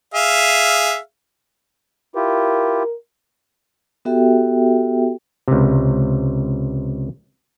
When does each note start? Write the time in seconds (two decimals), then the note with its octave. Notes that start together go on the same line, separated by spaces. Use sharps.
0.14 G#4 E5 F5
2.16 E4 F4 G4 A#4
4.05 B3 F#4 G4 A4 E5 G5
5.48 C#2 C3